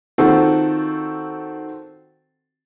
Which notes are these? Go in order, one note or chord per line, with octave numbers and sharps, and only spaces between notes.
D#3 C4 F4 F#4 A4